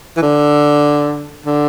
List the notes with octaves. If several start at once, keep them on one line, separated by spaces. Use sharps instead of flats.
E3
D3
D3